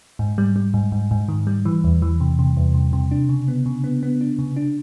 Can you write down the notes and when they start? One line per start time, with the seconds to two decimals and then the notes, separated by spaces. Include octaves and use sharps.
0.19 G#2
0.38 G3
0.56 G3
0.74 G#2
0.92 G#2
1.11 G#2
1.28 D#3
1.47 G3
1.65 E3
1.84 E2
2.02 E3
2.20 C3
2.39 C3
2.57 E2
2.74 C3
2.93 C3
3.11 D4
3.29 C#3
3.48 B3
3.66 C#3
3.84 B3
4.03 B3
4.21 D4
4.39 C#3
4.56 D4